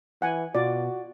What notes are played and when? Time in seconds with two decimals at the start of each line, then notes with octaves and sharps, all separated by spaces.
0.22 E3 F#5 G#5
0.55 B2 F4 F#4 D5